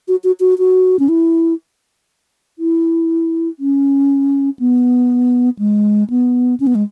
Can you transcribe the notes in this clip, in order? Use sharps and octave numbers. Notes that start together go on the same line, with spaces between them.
F#4
F#4
F#4
F#4
C#4
E4
E4
C#4
B3
G#3
B3
C#4
B3
G#3